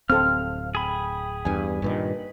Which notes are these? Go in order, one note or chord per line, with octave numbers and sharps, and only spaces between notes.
D1 C4 A4 F5 F6
G#4 G5 B5
E2 G2 G#5
G2 A#2 D#3 B4